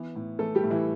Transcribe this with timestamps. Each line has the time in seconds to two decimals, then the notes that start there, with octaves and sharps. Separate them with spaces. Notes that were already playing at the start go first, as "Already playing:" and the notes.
Already playing: E3 B3
0.16 A2
0.39 E3 A3 A4
0.55 G3 G4
0.63 A2
0.70 E3 E4